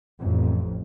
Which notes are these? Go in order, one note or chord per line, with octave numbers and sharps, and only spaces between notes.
A1 F2